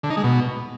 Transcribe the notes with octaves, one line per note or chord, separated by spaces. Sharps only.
D3
D#4
G#3
B2